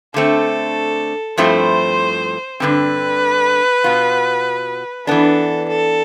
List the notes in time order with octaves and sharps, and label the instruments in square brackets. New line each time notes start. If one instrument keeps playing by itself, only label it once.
[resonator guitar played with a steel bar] D3 A3 C4 [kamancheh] A4
[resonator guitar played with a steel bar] G2 F3 A3 C4 E4 [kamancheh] C5
[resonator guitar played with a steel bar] G2 D3 F3 C4 [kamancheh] B4
[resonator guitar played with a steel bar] B2 B3 F4
[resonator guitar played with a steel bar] E3 B3 D4 [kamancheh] A4
[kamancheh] A4